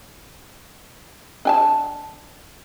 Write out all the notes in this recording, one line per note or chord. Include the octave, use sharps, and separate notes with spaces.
D4 G#5 A5